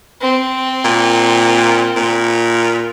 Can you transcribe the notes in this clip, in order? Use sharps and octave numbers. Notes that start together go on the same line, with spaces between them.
C4
A#2
A#2